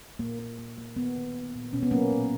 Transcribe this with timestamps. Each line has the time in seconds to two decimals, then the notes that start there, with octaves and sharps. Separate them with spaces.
0.19 A#2 A#3
0.39 A#3
0.58 A#3
0.78 A#3
0.96 D#3 B3
1.16 D#3
1.34 A#2
1.55 A#2
1.73 B2 C#4
1.83 B3
1.91 F#3 A#3 C#4
2.12 A#2